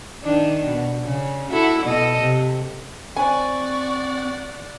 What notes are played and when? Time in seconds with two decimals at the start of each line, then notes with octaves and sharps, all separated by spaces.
0.23 D#3 D4
0.67 B2
1.05 C#3
1.50 E4 F#4 A4
1.84 B2 A4 D#5
2.19 C3
3.16 C4 D5 F#5 G#5 C#6